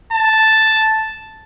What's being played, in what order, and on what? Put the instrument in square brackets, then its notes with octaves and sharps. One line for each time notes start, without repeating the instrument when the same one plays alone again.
[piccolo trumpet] A5